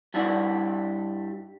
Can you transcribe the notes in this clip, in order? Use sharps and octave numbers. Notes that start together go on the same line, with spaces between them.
G2 G3 E4 D5 F#5